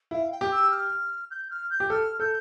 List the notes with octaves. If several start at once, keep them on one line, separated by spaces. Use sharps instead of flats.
E4 F5
G5
G4
E6
F6
G6
F6
G6
G4
A4 F6
A4 G6